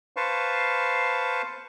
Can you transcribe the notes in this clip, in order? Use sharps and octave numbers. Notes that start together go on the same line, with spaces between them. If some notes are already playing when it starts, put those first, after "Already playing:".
B4 C5 F5 A5 C#6